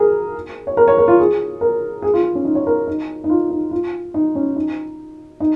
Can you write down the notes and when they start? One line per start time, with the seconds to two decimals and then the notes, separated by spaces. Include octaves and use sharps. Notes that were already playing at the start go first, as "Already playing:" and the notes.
Already playing: G#4 A#4
0.67 C#5
0.77 A#4
0.88 C#5
0.98 A#4
1.08 F4
1.19 G#4
1.61 A#4
2.02 G#4
2.13 F4
2.35 C#4
2.45 D#4
2.55 C#5
2.67 A#4
2.87 D#4
3.24 D#4
3.30 F4
3.50 D#4
3.71 F4
4.14 D#4
4.35 C#4
4.56 D#4
5.40 D#4